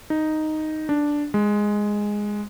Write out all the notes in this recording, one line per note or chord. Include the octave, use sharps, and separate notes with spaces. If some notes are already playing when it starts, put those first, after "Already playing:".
D#4
D4
G#3